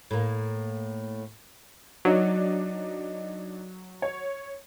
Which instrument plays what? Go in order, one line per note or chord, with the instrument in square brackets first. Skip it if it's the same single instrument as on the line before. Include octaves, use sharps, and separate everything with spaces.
[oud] A2 A#3
[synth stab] F#3 [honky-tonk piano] D4 D#4 D5
[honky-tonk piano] C#5